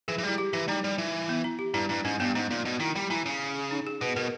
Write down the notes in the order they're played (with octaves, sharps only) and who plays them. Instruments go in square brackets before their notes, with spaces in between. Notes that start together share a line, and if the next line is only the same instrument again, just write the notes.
[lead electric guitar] E3 [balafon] G#4
[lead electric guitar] E3
[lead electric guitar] G3 [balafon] E4
[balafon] G4
[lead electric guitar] E3 [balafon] E4
[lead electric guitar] G3 [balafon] D#4
[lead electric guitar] G3
E3
[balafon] B3
E4
G4
[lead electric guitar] G2 [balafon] E4
[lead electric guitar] G2 [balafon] E4
[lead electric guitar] G#2 [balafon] C#4
[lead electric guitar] G2 [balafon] B3
[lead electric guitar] G#2 [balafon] D#4
[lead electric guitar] A#2
B2
[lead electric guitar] D#3 [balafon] E4
[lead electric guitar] G3
[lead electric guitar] E3 [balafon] E4
[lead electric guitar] C#3
[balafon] D#4
G#4
[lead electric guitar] B2 [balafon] B4
[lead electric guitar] B2 [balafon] A#4